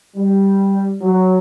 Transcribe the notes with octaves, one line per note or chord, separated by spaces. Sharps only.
G3
F#3